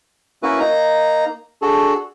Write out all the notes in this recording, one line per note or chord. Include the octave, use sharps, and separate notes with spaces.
A#3 C#4 E4 F#4 B4
A#3 D#4 A#5
D4 F#4 G#4 A4